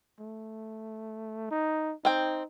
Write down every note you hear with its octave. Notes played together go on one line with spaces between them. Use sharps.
A3
D#4
C4 D#4 G5